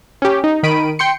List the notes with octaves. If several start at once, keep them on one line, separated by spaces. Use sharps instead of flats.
C#4 G4
D#4
D#3 B5 D7 D#7
G5 C6 C#7